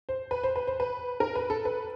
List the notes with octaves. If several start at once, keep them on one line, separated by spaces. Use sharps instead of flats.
C5
B4
C5
B4
C5
B4
A#4
B4
A4
B4